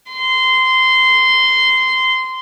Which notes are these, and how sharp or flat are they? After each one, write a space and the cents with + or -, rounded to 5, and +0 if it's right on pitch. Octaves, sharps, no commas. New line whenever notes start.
C6 -15